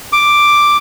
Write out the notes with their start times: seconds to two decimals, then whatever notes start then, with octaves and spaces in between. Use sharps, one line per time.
0.13 D6